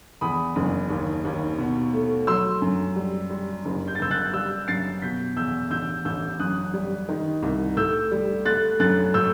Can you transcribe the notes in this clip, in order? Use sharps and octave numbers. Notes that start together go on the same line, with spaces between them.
E2 B5 D#6
F#1
D#2
D#2
B2
A3
F#3 C6 E6
F#2
G3
G3
F#1
G6
A6
F#1 E6 G6
F#6 A6
G3 E6 G6
F#2 A6 C7
B2 G6 B6
E2 E6 G6
A1 E6 G6
A1 E6 G6
F#2 D#6 F#6
G3
D#3
C2
A2 E6 G6
G3
A3 F#6 A6
F#2 F#6 A6
A2 E6 G6